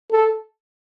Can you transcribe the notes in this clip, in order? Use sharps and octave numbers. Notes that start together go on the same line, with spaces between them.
A4